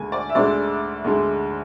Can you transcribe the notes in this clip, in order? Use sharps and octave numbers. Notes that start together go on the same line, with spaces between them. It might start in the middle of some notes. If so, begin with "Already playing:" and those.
Already playing: D2 D3 G#3 G#5
D5
E5
D2 D3 G#3 D5
D2 D3 G#3